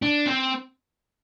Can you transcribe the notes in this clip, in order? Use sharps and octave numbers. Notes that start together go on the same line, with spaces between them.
D4
C4